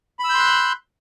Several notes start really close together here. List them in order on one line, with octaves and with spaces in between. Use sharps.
B5 E6 G6 C6 F#6